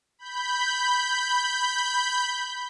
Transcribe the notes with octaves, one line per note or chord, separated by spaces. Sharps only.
B5 G6